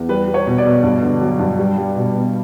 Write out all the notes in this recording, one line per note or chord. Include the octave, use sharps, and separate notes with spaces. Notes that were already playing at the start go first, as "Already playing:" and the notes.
Already playing: E2
G3 B4
G3
C#5
B2
D5
B2
G2
D3
F#3
G2
G3
G3
B2
B2